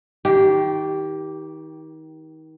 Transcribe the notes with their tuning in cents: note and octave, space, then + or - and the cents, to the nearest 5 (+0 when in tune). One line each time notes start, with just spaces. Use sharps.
D#3 +30 G4 -10